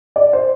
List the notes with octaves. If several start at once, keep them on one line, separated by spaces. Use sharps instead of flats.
D5
C5